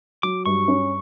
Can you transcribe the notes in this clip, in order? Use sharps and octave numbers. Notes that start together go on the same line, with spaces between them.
F#3 D6
G2 C#6
C#4